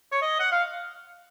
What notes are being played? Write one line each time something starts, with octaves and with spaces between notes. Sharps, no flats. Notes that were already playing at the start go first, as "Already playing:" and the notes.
C#5
D#5
F#5
F5